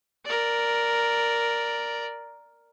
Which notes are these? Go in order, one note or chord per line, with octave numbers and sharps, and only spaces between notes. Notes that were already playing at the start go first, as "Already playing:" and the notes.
A#4 D5